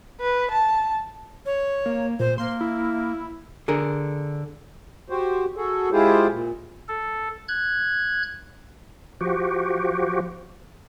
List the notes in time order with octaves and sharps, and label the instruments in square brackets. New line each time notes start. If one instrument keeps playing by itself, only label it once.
[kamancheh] B4
A5
[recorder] C#5
[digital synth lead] A#3
[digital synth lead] A#2 [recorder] C5
[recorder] A#3 [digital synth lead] C6
[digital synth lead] E4
[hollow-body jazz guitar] D3 G#4 A#4
[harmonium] F#4 G4 C5
F#4 G#4 A4
G#3 E4 F4 G4 G#4 C5
A#2
[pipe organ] A4
F#6 G#6
[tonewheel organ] F3 F#4 G4